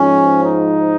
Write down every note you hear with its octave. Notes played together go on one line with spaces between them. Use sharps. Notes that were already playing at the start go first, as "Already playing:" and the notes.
Already playing: G#2 F3 C#4
D#4